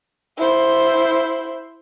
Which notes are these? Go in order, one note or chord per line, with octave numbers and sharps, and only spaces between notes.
E4 C5